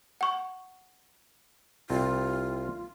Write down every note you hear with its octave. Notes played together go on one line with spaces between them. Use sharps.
F#5 C#6
C2 C4 F4